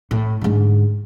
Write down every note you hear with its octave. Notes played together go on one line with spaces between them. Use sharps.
A2
G#2 D3